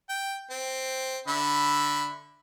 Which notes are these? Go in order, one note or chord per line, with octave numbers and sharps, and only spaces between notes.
G5
C4
D3 E5 B5